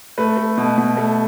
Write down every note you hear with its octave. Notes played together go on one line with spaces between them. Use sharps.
A3 B4
A3
B2
B2
A3